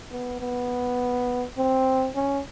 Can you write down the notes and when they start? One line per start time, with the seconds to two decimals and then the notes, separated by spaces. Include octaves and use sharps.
0.12 B3
0.40 B3
1.58 C4
2.16 C#4